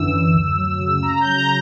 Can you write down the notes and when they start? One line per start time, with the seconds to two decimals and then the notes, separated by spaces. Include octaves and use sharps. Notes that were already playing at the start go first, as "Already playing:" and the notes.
Already playing: F#2 D3 E3 E6
0.11 F#2
0.34 D2
0.57 F#3
0.80 C#3
1.03 C#3 A#5
1.21 F#3 G6
1.38 A#5